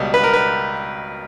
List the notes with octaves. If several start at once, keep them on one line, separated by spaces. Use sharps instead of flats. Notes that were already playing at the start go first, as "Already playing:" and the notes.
Already playing: C#2 B2 G3
B4
A#4
B4